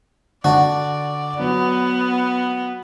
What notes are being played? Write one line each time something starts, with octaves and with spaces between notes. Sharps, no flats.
D3 F#4 D5 A5
F#3 B3